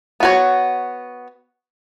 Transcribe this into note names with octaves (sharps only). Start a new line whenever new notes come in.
B3 F#4 C#5